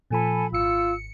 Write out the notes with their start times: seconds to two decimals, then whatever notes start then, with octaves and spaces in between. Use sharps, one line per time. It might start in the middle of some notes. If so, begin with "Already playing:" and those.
0.11 A#2 F3 A4 G#5 B5
0.52 G#1 F4 E6 C#7